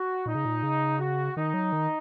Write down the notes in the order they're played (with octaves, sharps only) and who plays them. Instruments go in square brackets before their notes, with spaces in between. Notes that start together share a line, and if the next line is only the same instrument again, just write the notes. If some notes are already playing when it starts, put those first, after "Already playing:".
Already playing: [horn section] F#4
[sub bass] A#2 [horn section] D#4
[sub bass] C#3
A#2
C#3
[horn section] F#4
[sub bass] D#3 [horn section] D#4
[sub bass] F#3
D#3